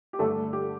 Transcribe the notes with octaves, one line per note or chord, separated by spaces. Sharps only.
G4
G2 D3 A3 A4
G4